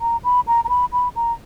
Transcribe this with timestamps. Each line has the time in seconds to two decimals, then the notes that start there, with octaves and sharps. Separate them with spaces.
0.01 A#5
0.24 B5
0.47 A#5
0.65 A#5
0.69 B5
0.93 B5
1.16 A#5